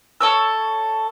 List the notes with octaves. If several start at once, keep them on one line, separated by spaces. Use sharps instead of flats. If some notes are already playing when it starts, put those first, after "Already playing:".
A4 C#5 E6